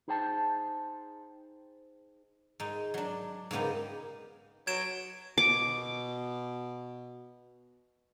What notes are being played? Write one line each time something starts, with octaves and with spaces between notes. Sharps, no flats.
D#4 G#4 C5 G5 A5
G#2 D#4
F#3 D4
G#2 C#3 A#3 B3 D#4 G4
F#3 G#6 D7 E7
B2 D6